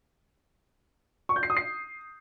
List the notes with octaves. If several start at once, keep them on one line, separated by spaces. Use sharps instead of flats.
C#6
G6
C7
D#6
C7